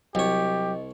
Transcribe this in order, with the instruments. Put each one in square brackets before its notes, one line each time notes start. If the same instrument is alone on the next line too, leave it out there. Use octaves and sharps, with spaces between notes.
[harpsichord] C2 C#5 [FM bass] F#3 [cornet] G4 [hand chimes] D#5